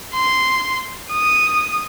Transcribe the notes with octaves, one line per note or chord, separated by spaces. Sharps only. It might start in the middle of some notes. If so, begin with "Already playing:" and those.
C6
D#6